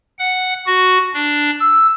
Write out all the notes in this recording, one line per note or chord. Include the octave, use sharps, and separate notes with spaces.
F#5
F#4
D4
E6